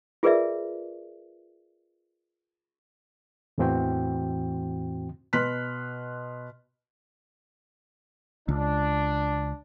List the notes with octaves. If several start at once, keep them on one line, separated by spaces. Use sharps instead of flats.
F4 G#4 A#4 B4 D5 E5
E2 A2 E3 C4 F#4 G5
B2 B4 C6 F6 F#6 B6
C#2 D4